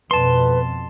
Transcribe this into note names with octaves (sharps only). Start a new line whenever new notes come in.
F2 B2 B4 A5 C6